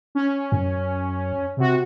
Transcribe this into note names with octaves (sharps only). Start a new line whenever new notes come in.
C#4
F#2
C3 F#4